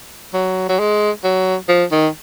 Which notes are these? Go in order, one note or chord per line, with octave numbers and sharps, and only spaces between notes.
F#3
F#3
G#3
F#3
F3
D#3